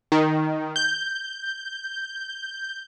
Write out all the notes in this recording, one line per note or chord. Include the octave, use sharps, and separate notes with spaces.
D#3
G6